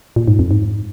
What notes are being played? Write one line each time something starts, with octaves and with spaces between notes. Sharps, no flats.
A#2
G#2
F2
G#2